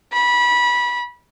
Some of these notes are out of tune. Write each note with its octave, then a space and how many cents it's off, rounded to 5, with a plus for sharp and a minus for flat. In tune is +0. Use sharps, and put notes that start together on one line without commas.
B5 -25